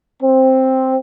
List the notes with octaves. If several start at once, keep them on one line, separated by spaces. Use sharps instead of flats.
C4